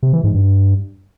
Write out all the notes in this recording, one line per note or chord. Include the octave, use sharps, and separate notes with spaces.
C3
E3
G#2
G2